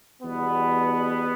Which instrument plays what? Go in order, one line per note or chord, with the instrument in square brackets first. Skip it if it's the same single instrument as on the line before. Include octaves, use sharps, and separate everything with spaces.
[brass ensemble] E2 B2 G3 B3